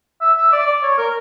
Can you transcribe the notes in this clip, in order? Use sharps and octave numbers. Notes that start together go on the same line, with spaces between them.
E5
E5
D5
D5
C#5
A#4